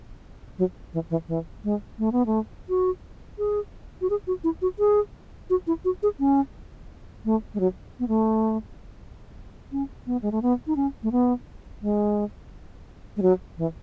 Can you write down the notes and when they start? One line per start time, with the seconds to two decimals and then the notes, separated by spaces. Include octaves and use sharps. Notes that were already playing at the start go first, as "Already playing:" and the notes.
0.58 F#3
0.93 E3
1.10 E3
1.28 E3
1.64 G#3
1.99 A3
2.12 B3
2.26 A3
2.69 F#4
3.38 G#4
4.01 F#4
4.10 G#4
4.27 F#4
4.44 E4
4.62 F#4
4.79 G#4
5.50 F#4
5.67 E4
5.85 F#4
6.03 G#4
6.19 C#4
7.25 A3
7.54 G#3
7.60 F#3
7.99 B3
8.08 A3
9.72 C#4
10.07 B3
10.22 G#3
10.32 A3
10.42 B3
10.67 D#4
10.76 C#4
11.03 A3
11.12 B3
11.82 G#3
13.17 G#3
13.22 F#3
13.58 E3